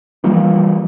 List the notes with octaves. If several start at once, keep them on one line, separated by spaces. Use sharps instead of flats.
E3 F3 G3 A#3